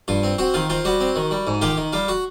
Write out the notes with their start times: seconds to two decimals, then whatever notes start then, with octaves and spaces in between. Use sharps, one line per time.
0.08 G2 F4
0.23 C4
0.38 C4 F#4
0.54 D#3 F4
0.70 C4 F4
0.85 G3 F#4
1.00 C4
1.16 D#3
1.31 G3
1.47 G#2
1.62 D#3 F4 G4
1.77 D#3
1.93 G3 F4
2.08 F#4